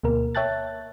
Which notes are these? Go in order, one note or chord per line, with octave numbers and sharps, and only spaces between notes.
D2 B2 A#3 A#4
C#5 E5 G5 A5 F#6 A6